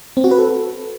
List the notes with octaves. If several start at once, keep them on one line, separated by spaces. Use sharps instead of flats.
C4
F#4
B4
A4